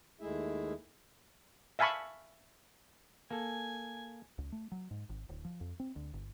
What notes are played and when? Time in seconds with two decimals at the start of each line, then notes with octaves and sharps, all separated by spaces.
0.21 D#2 G#3 A3 E4 G#4 E5
1.79 E5 F5 G#5 A5 B5 C#6
3.31 A#3 A4 G#5
4.38 C#2
4.52 A3
4.72 F#3
4.91 G#2
5.09 G#1
5.29 D1
5.45 F3
5.61 F2
5.80 C4
5.96 D2
6.14 G1